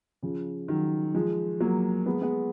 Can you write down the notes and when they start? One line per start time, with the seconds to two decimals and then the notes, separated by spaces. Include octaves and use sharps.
0.22 C#3 F3
0.68 D#3 F#3
1.15 F3 G#3
1.60 F#3 A#3
2.06 G#3 B3
2.21 G#3 B3